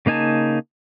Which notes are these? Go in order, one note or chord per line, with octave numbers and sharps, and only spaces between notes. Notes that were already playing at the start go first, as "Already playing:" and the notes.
C#3 A#3 D#4 G#5 A5